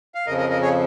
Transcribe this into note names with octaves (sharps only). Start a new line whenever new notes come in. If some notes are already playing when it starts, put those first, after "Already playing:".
F5
F2 C#3 F3 A#4 D#5
A#4 D#5
A#4 D#5
G#4 C#5